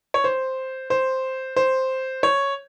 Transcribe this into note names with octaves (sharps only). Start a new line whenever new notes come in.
C#5
C5
C5
C5
C#5